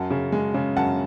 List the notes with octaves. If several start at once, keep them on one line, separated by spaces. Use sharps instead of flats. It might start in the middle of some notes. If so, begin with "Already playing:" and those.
Already playing: F#2 F#5 A5
C#3
G#3
C#3
F#2 F#5 A5